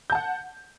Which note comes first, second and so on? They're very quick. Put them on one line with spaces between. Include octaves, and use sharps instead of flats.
G6 A5 F#5